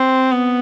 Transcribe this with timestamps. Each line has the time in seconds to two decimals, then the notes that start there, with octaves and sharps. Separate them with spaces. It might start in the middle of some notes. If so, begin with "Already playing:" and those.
Already playing: C4
0.31 B3